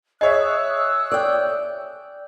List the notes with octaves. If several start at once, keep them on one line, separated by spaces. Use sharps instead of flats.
G#4 C#5 D#5 E5 D#6 E6 F#6
D5 G5